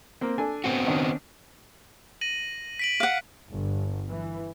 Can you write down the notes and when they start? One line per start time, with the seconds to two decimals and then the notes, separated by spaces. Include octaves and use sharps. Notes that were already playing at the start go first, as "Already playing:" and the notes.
0.21 A#3 C4
0.38 D4 A4 G#5
0.64 B3 C4 F#4
0.87 D#3 C#4 D4
2.21 A#6 D#7 F#7
2.79 B6 D7 F#7
3.00 F5 F#5
3.53 G1
4.09 E3